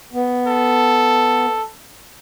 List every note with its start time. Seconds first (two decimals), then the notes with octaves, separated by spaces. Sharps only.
0.13 B3
0.47 A4